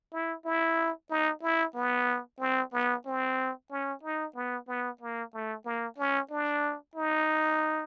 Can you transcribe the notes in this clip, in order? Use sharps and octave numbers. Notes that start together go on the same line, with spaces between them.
E4
E4
D#4
E4
B3
C4
B3
C4
C#4
D#4
B3
B3
A#3
A3
A#3
C#4
D4
D#4